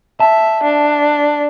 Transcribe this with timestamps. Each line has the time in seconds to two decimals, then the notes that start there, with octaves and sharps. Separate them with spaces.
0.20 E5 A5
0.63 D4